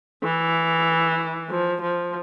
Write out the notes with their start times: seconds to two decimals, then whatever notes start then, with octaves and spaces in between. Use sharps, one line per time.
0.24 E3
1.50 F3
1.82 F3